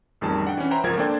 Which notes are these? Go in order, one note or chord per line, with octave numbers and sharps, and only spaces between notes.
A1 F2 D#3 G3 G#4 A5
D4 F#5 G5
E3 C#4
B4 C5 E5 F#5 G5 A#5
G#1 C#2 F3 A#4 G#6
A#3 D4 A4 C5 D5 G5